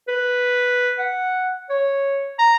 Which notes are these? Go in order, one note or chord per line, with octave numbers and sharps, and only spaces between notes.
B4
F#5
C#5
A#5